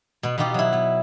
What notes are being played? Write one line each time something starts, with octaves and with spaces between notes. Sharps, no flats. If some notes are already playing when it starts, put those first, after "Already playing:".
B2 B3
B2 B3 D#4 F4 G4
F#3 E4
B3